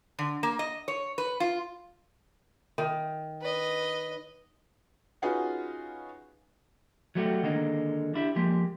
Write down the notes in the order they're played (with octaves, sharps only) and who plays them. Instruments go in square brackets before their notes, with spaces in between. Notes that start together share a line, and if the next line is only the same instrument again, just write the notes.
[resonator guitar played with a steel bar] D3
A#3
D#5
C#5
B4
F4
[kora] D#3
[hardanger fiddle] B4 D#5
[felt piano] C#4 D#4 F4 F#4 G#4 B4
[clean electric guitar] F#3 G3 A3 F#4 G4
D3 D#3 G#3 A#3 D#4
D4 E4 G4
F3 G#3 A#3 G4